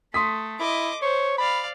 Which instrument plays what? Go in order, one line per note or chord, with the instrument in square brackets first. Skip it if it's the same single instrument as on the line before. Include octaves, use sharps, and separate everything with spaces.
[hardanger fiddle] A3 [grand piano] C6 D#6 B6
[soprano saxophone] E4 [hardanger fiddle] D#5 D6
[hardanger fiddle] C5 [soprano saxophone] C#5
[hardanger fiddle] D5 F5 [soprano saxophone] B5